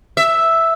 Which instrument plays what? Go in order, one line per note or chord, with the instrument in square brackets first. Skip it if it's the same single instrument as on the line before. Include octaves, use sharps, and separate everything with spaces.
[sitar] E5